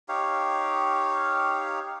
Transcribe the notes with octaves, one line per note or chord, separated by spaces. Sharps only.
D#4 G4 C#5 F5